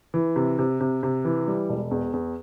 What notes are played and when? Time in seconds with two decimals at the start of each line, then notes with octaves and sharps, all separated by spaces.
0.14 E3
0.36 C3
0.59 C3
0.81 C3
1.03 C3
1.25 E3
1.48 G3
1.70 E1
1.91 E2
2.13 E2